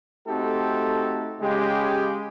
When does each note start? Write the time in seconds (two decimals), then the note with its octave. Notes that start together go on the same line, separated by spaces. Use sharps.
0.27 A3 C4 D#4 F#4 G4 A4
1.41 C#3 G#3 G4